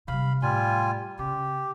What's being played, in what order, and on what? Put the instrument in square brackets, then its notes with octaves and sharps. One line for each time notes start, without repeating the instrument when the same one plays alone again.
[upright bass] C3 G3 [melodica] F5 B5
[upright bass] A2 [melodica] G3 F4 G#5
[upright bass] C#3 [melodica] G4